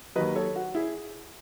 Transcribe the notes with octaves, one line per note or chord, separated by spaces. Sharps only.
D#2 D#3 F#3 B4 D#5
A4 C#5
F#4
E4 G#4